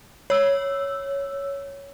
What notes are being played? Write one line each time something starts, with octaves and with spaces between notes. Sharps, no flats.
C#5 E6